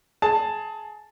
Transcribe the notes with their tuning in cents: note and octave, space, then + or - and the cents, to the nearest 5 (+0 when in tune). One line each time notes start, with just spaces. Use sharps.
G#4 +25 A5 +10